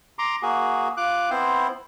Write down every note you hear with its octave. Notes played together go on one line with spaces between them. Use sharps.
A#5 C6 D6
A#3 F#4 G#4
F4 D6 F#6
B3 C4 E4 C5